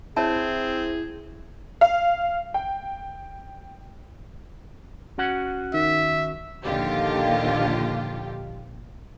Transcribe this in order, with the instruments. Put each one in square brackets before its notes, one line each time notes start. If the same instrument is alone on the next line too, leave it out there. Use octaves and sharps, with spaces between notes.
[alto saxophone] C4 [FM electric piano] E4 [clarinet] G#4 [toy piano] C#5 A5
[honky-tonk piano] F5
G5
[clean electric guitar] C#4 F#4 F#5
[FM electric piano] D#3 [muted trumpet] E5
[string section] A#1 D#2 D3 F4 G4